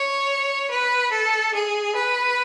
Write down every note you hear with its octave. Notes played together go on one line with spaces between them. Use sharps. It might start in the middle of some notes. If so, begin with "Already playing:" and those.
Already playing: C#5
B4
A4
G#4
B4